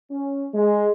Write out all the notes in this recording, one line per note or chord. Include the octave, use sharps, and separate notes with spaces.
C#4
G#3